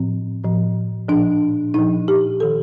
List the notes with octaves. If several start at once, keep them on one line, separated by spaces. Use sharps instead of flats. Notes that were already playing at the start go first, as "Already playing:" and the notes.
Already playing: A2 F3 C4
A2 F3
A#2 F3 D4
A#2 F3 D#4
G4
D#3 A4